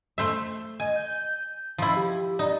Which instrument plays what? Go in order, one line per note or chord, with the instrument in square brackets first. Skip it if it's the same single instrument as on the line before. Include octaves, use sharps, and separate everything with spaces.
[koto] A3 C5 E5
[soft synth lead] D#5 [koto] G#5
[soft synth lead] G6
[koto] F3 E4 [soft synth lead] B5
[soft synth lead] G4
[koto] D#4 [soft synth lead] D5